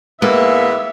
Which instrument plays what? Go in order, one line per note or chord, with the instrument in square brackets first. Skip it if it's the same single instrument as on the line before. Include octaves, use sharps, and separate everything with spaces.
[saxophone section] G#2 E3 B3 [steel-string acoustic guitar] A#3 [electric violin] E5